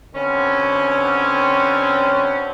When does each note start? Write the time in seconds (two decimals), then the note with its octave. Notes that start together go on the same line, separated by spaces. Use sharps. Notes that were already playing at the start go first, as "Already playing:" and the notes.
0.15 B2 D3 C4 C#4